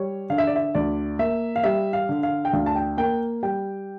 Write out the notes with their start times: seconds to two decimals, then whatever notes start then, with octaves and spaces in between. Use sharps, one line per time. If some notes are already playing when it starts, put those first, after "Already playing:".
Already playing: G3 C#5
0.30 D3 F5
0.38 E5
0.47 D5
0.56 E5
0.75 D2 D5
1.19 A#3 E5
1.56 F5
1.64 G3 E5
1.93 F5
2.09 D3
2.23 F5
2.45 G5
2.53 D2 F5
2.66 A5
2.76 G5
2.97 A#3 G5
3.43 G3 G5